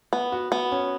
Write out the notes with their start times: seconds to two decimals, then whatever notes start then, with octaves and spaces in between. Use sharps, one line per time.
0.13 B3
0.32 F#4
0.52 B3
0.72 C#4